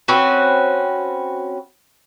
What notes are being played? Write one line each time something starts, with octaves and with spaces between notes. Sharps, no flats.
C4 C#4 F#4 B4